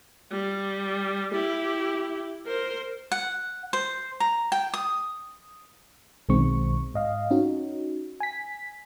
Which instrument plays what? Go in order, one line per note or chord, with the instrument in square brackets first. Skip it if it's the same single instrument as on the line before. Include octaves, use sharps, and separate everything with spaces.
[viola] G3
E4 G4
A#4 C5
[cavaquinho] F#5
C5
A#5
G5
D#6
[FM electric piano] B1 B2 D#3 G#3 C4 C#6
G#2 D#5 F5
C#4 D#4 F#4
G#5 B6